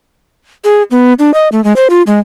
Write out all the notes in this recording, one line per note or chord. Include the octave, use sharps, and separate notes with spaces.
G#4
B3
D4
D#5
A3
G#3
C5
F4
G#3